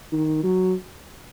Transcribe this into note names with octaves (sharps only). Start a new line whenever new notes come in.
D#3
F#3